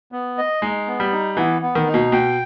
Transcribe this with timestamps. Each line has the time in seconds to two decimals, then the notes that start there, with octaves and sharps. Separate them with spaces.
0.12 B3
0.38 D#5
0.62 G#3 D#4
0.87 B3
1.00 G3
1.12 D#4
1.37 E3 B3
1.62 B3
1.75 D#3
1.87 D#4
1.94 B2
2.12 B2 G5